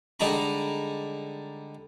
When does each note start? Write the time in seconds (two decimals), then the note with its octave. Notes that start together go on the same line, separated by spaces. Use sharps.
0.20 D3 G3 G#3 D#4 A#5 B5